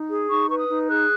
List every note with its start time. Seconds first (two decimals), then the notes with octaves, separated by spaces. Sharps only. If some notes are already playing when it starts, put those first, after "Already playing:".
Already playing: D#4
0.10 G#4
0.29 D#4 C#6
0.49 B4 C#6
0.58 D#6
0.69 D#4
0.89 G#4 F#6